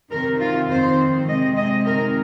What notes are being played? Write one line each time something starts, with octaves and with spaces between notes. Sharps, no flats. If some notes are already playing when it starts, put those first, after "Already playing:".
C3 D#3 C4 A#4
F4
F2 D#3 C4 C5
C3 G#3 C4 D#5
D#5
C3 D#3 G#3 A#4